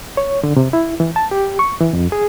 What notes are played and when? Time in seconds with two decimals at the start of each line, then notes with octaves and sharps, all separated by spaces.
0.17 C#5
0.43 D3
0.56 C3
0.73 E4
1.00 E3
1.16 A5
1.31 G4
1.59 C#6
1.81 E3
1.93 F2
2.12 G#4